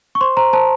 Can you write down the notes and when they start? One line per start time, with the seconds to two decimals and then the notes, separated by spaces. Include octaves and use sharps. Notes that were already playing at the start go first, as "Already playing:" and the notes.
0.15 C#6
0.21 C5 C6
0.37 C5 A#5
0.53 C5 A5